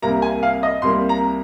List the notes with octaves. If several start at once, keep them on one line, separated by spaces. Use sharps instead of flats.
C2 C3 G3 A#3 A#5
G#5
F5
D#5
C2 C3 G3 A#3 C6
A#5